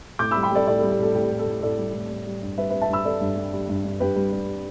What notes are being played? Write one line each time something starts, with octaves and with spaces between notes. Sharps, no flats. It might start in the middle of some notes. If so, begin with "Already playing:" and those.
A2 D6 G6
G3 B5 E6
G5 B5
G3 A4 D5
A2 A4 D5
G3 A4
G4
A2 A4
A2 G4
A2
A4
A2
A2 A4 D5
G3
A2
G3
G3
G2
G3 B4 E5
G3 B4 E5
E5 A5
G2 B5 E6
G3 A4 D5
G2
G3
G3
G2
G2
G2 G4 B4
G3
G3